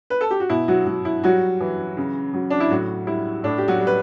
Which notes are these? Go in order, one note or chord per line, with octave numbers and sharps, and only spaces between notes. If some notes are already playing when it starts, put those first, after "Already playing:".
B4
A4
G4
F#4
B2 E4
F#3 F#4
F#3
E4
F#3 G3 F#4
E3
C#3
F#3
D4
E4
A2 F#3 F#4
G3 E4
A2 D4
G4
F#3 F#4
G3
B4